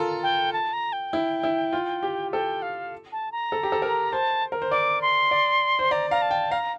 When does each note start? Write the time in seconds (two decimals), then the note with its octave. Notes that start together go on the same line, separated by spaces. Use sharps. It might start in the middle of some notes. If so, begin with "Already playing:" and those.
Already playing: F4 A4 A#4
0.23 G5
0.53 A5
0.73 A#5
0.93 G5
1.13 E4
1.43 E4
1.73 F4
2.03 G4
2.32 A4 G5
2.62 F5
3.12 A5
3.32 A#5
3.52 A4
3.63 G4
3.72 A4
3.82 A#4
4.12 C5 A5
4.52 A#4
4.62 C5
4.71 D5 D6
5.02 C6
5.31 D5
5.79 C5
5.91 D5 A#5
6.11 F5 A#5
6.22 A5
6.31 G5
6.51 F5 A#5